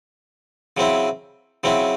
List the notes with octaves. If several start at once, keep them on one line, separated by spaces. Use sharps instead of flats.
C#3 F#3 C4 E4
C#3 F#3 C4 E4